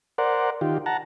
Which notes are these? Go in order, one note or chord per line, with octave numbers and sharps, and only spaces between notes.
A#4 C5 D5 F#5
D#3 F4 G4
F#5 A5 A#5